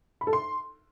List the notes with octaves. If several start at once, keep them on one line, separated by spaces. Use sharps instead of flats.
B5
A4
C6